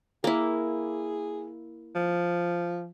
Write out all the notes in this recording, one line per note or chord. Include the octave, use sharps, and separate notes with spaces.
A#3 E4 G#4
F3